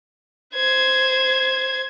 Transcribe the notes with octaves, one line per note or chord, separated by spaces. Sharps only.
C5 G#6